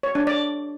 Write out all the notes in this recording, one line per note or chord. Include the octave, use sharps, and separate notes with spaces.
C#5
D4
D5